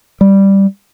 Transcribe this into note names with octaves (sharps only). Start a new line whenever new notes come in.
G3